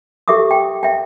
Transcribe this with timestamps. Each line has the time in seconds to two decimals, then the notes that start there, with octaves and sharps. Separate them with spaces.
0.28 G4 A4 E5 D6 D#6
0.51 G5
0.83 E5 G5